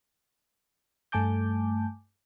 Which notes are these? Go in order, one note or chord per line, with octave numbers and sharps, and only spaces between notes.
G2 A3 G#5 A5 D6 G6